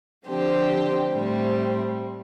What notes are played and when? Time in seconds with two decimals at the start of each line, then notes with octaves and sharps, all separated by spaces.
0.27 D3 F3 C4 G4 C5
1.11 A2 G3 C4